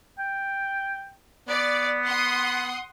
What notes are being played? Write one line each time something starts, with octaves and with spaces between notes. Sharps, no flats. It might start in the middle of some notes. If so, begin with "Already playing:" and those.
G5
B3 D5
F#5 C6 D#6